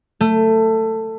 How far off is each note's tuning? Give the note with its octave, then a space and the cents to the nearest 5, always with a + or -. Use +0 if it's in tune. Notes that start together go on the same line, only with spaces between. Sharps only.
A3 +15